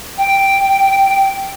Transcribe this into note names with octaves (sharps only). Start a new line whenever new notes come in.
G5